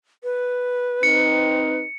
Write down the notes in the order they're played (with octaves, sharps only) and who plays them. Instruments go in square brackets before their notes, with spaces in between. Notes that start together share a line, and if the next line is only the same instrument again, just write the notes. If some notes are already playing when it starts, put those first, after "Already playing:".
[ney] B4
[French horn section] C4 D#4 [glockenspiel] C#7